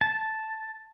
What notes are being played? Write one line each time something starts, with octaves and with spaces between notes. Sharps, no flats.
A5